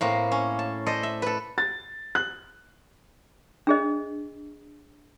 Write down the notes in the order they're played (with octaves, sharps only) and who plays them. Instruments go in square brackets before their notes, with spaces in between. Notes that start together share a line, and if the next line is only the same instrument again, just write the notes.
[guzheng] A2 A#3 C4
C#4
A5
A4 C5 D5 D#5
E5
A4 B4
[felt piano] A6
F#6
[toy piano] D4 G#4 D#5